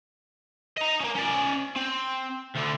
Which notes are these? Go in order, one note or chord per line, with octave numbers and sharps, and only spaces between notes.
D#5 A#5
A#3 C#4
C#4 D5
C4
D2 D3